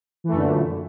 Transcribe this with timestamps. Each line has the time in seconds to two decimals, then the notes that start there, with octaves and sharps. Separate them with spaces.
0.24 E3
0.28 A3
0.33 F#2
0.37 D3
0.41 A#2